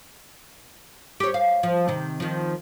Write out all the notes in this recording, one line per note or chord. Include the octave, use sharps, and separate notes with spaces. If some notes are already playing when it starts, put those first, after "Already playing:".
G4 C#5
F5
F3
C3 D#3
D#3 F3